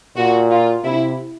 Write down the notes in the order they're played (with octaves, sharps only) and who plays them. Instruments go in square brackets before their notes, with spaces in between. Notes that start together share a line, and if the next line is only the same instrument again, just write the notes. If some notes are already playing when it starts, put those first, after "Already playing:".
[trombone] A#2 [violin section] F#4
[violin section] F4
[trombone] C3 [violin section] E4